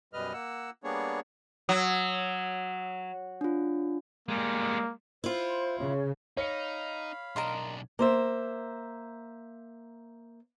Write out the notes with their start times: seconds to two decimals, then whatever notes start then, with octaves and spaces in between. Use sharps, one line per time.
0.13 F#2 B2 G3 B4 D#5 F6
0.33 A#3 F#5 E6
0.84 G3 A#3 B3 D4 G#4 C#5
1.69 F#3 D#6 E6
3.41 D4 F4
4.29 G3 G#3 A#3
5.24 E4 F4 C5
5.79 C#3 C#5
6.37 D#4 C#5 F5 B5 C#7
7.36 B1 D4 A#4 D#5 C6
7.99 A#3 C5 E5